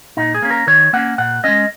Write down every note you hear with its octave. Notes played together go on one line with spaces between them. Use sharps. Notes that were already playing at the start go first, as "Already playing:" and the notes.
A#2 D#4
G#4
A#3 C#4
A#4
D#3 C#5
A#3 C#4 F#5
A#2 F#5
G#3 C#4 D#5